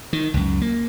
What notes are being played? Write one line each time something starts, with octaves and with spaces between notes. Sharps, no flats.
D#3
C#2 F#2
A#3